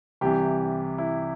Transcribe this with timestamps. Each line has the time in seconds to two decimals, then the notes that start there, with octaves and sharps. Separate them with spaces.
0.21 C2 C3 E3 G4
0.98 E4